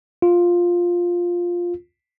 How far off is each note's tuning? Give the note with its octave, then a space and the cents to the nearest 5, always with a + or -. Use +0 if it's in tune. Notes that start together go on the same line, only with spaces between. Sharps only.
F4 +5